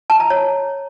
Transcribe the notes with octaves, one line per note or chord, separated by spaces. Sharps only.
A5
A#5
C#5